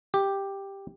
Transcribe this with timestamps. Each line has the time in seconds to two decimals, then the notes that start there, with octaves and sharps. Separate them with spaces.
0.14 G4